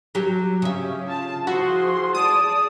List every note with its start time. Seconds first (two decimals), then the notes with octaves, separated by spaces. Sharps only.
0.15 F#3 G4
0.62 C#3 C#4 G4 E5
1.06 F4 A5
1.47 F3 E4 F#4 G#4 C6
2.15 G#4 D5 A5 D#6